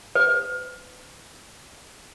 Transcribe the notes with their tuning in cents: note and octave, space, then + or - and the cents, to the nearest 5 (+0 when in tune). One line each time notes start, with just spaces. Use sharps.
B4 +40